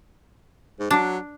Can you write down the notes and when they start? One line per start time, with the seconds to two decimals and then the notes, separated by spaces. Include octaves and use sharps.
0.79 G#2
0.91 F#3 D4